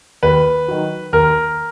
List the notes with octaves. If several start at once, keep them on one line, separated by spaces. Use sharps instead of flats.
D#2 B4
D#3 F#3
D#2 A#4